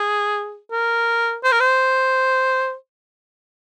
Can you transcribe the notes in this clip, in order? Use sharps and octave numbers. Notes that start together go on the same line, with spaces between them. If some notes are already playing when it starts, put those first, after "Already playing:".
Already playing: G#4
A#4
C5
A#4
C5